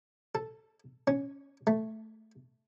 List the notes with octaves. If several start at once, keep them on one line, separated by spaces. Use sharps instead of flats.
A4
C#4
A3